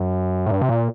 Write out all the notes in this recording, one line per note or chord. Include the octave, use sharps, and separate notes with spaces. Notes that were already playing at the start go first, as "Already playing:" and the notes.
Already playing: F#2
A2
G2
C3
A#2